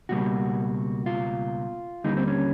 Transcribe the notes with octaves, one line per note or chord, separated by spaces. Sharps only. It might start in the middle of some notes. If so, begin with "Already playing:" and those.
C#2 B2 G3 A#3 F#4
F4
D#2 D3 G3 A#3 D#4
C4
C#4